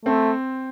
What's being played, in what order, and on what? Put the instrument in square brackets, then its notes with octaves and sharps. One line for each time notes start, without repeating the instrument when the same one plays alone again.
[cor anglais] A3 [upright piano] C4